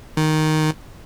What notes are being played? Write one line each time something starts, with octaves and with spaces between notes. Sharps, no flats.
D#3